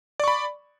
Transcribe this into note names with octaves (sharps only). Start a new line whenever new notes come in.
D5 B5 C#6